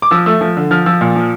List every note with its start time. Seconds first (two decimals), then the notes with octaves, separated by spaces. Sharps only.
0.02 D6
0.11 F3 E6
0.26 A3 E6
0.41 F3
0.57 D3
0.71 F3 F6
0.86 F3 E6
1.01 A#2
1.16 F3